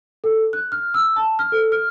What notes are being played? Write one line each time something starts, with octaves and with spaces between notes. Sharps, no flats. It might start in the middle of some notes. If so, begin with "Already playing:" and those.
A4
F#6
F6
E6
A5
F6
A4
F6